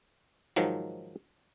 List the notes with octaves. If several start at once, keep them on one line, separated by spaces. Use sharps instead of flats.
G#2 D#3 F3 F#3